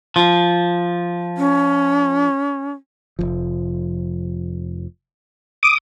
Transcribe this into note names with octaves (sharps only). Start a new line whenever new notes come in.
F3
C#4
F1 A#1 F3
D6 D#6